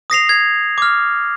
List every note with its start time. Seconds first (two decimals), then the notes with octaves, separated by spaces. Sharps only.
0.10 D#6 A#6 C7 F7
0.29 G#6
0.78 D6 F6